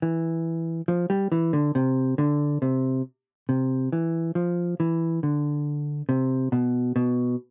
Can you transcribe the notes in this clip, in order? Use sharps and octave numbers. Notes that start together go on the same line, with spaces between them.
E3
F3
G3
E3
D3
C3
D3
C3
C3
E3
F3
E3
D3
C3
B2
B2